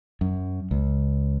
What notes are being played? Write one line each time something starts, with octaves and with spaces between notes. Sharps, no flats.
F#2
C#2